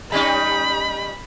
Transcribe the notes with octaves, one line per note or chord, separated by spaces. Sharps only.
G3 C#4 D#4 B5